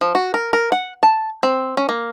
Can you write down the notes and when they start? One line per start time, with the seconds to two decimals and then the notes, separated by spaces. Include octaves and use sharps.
0.01 F3
0.15 F#4
0.34 A#4
0.53 A#4
0.72 F#5
1.03 A5
1.43 C4
1.77 C#4
1.89 A#3